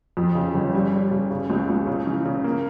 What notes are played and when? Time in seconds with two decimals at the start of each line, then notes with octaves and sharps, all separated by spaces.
0.17 F2
0.35 C#3
0.55 G1
0.74 G3
0.93 G3
1.11 C#3
1.31 C#3
1.50 C#2
1.69 C#2
1.87 C#3
2.07 E3
2.25 C#3
2.44 A#3